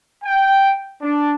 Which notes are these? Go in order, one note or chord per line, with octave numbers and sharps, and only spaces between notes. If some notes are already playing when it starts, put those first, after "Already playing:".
G5
D4